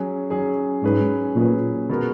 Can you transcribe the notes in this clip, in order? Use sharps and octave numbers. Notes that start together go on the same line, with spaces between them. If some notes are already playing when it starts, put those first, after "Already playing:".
Already playing: F#3 C#4 G#4
F#3 C#4 G#4
G#2 F#3 C#4 G#4 B4
A#2 F#3 C#4 G#4 B4
B2 G#3 B3 F#4 A#4